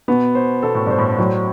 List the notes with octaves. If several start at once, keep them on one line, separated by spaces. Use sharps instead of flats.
B2 B3
C5
B2 A4
A2
G2 C5
A2
A2 F#3